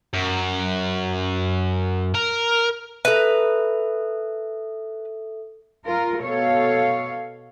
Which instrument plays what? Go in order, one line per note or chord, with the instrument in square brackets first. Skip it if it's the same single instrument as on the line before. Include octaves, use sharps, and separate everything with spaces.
[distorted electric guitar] F#2
A#4
[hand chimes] A4 E5 [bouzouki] B4 A#5
[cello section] F4 A#4
B2 A4 C#5 F5